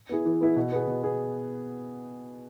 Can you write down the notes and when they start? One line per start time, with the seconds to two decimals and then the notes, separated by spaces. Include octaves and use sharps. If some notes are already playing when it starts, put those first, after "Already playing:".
0.09 B3 E4 G#4
0.25 E3
0.41 B3 E4 G#4
0.56 B2
0.72 B3 G#4
0.87 B2
1.03 B3 G#4